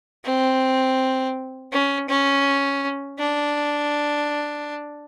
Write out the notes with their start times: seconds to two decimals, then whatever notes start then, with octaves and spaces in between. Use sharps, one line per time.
0.25 C4
1.72 C#4
2.09 C#4
3.19 D4